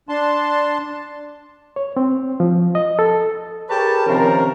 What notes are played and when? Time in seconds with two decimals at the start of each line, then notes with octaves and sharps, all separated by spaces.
0.09 D4 A5 C6
1.76 C#5
1.97 C4
2.40 F3
2.75 D#5
2.99 A4
3.69 G4 G#4 A#4 B4 C#5 A5
4.06 C3 D#3 F3 C#4 A#4